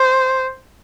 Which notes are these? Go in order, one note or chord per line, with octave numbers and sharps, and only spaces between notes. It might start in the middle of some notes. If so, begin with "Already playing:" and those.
Already playing: C5